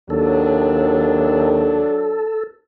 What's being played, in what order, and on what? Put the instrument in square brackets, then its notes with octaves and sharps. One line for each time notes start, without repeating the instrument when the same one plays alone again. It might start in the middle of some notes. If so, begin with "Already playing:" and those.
[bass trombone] D#2 [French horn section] F#3 D4 [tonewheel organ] A4